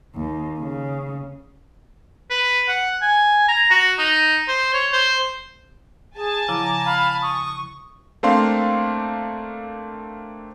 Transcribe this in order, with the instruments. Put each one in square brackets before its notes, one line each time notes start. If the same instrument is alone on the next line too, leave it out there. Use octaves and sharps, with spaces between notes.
[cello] D#2
C#3
[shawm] B4
F#5
G#5
A#5
F#4
D#4
C5
C#5
C5
[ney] G#4 [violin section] G#5 A5
[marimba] C#3 F3 E4 [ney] A#5 [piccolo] D6
[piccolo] F5 [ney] B5
[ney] C#6 [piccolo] D#6
[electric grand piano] A3 A#3 C4 D4 F5 C6